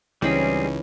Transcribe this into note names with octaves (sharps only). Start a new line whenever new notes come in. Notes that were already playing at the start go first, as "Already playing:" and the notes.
C#2 E3 G3 C4 C#4 D#4 G#4 B5